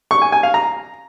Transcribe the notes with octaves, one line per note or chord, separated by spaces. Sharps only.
C#6
G#5
G#5
F5
A#5